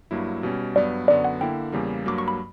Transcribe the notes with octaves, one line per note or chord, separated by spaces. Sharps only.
G2 F#3 A#3 E4
B2 G3 C#4
G2 F#3 B3 D5
F#2 D3 F#3 B3 F#4 D5
F#5
D3 A#3 E4 G5
E2 C#3 G3 A#3
G2 F#3 A#3 D6
C#6
B5